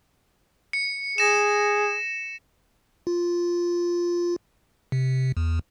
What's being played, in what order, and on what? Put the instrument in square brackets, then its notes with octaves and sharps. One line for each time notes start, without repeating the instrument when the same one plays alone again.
[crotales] C#7
[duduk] G#4 [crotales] A#6 E7
[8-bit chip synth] F4
C3
E2